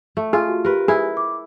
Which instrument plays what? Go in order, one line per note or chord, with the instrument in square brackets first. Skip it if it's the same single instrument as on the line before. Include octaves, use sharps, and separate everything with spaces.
[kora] A3
[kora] F4 [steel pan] G#4
[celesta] F#4
[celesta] G4 [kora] A#4 B4
[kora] E4 [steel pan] G#4
[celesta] D6